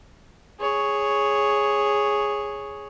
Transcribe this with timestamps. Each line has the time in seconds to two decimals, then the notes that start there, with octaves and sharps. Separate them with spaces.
0.60 G#4 C#5